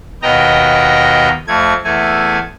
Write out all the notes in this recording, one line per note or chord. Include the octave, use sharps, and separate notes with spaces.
D#2 B2 B3 D#5 G5 A#5
F2 A3 G#6
E2 A3 G#5